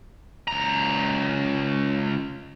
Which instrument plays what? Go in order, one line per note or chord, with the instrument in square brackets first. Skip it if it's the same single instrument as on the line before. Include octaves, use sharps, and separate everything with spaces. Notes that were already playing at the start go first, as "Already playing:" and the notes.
[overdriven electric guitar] C#2 A#5